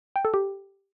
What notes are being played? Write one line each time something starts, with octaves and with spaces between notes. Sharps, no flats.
G5
A4
G4